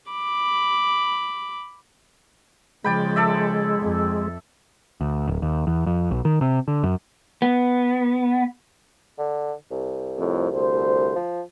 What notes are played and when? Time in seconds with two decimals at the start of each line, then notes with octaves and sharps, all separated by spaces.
0.11 B5 D6
2.84 C#3 F3 G#3 D5 G5 B5
3.16 A4 D5 E5
3.80 F2
5.01 D2
5.27 D1
5.42 D#2
5.67 E2
5.86 F2
6.11 B1
6.25 D#3
6.41 C3
6.68 D3
6.83 F#2
7.42 B3
9.18 D3
9.71 C2
10.19 F2 A2
10.53 D2 C5
11.16 F3